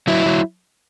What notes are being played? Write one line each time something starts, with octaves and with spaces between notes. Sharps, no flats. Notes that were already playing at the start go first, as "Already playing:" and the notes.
F#3 E4
F#3